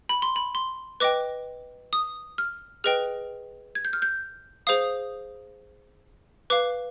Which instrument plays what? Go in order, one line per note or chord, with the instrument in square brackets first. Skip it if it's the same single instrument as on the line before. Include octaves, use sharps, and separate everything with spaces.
[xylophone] B5
C6
B5
C6
B4 D#5 G5 D6
D#6
F6
G#4 B4 D#5 G5 F6
G#6
G6
F6
G6
G#4 C5 F5 D#6
B4 F5 D6